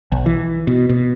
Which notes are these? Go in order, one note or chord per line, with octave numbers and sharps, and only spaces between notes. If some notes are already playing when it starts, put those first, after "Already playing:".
B1
E3
B2
B2